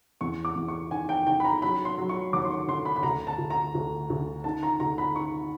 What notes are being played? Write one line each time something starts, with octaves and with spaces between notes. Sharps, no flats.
E2 C#6
D6
E2
C#6
D#3 G#5
G5
D#3 G5
B5
A#5
F#3 B5
C6
F#3
C#6
D#2 D6
C6
C#6
D3 C6
B5
B5
D2 A#5
A5
D2
A#5
D2
D2
D#3 A5
A#5
D2 A#5
B5
D#3 C#6